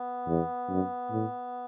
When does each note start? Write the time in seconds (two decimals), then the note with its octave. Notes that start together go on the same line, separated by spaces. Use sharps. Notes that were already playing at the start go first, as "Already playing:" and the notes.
Already playing: B3
0.27 E2
0.69 F#2
1.11 A2